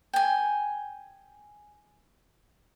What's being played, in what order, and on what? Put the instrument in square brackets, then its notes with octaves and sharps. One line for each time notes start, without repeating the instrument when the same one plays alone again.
[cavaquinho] G5 G#5